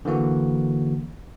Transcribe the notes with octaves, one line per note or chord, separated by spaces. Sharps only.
D3 E3 A#3 F#4